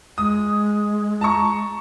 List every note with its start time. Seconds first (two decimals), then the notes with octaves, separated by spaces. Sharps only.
0.18 G#3 D#6
1.21 A5 A#5 C#6